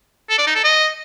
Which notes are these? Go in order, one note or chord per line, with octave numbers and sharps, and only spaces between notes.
A4
D5
D#4
A4
D#5